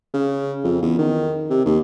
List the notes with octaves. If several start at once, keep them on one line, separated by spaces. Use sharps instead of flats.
C#3
F2
E2
D#3
C3
D#2